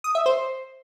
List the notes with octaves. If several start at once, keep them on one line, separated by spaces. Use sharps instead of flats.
D#6
E5
C5